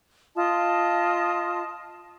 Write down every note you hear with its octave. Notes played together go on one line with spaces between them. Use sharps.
F4 D#5 A5 D#6